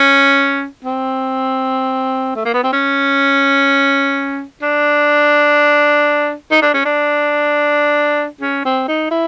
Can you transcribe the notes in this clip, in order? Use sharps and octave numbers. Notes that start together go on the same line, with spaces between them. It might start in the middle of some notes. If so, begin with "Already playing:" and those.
Already playing: C#4
C4
A3
A#3
B3
C4
C#4
D4
D#4
D4
C#4
D4
C#4
C4
D#4
E4